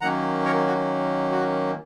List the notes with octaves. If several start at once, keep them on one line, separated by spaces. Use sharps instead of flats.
D#3 F#3 A#3 C#4 F#5 A#5
A#4 C#5
F#4
F#4